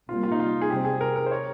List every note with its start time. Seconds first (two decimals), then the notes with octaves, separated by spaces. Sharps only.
0.09 C3 G3 A#3 F4
0.23 F4
0.32 D#4
0.40 F4
0.61 G#4
0.70 C3 G3 C4 G4
0.85 G#4
1.01 A#4
1.16 A#4
1.26 C5
1.31 C#5